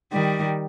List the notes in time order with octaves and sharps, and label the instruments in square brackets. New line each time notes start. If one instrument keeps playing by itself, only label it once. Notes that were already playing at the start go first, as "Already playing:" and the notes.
[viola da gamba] D#3 G3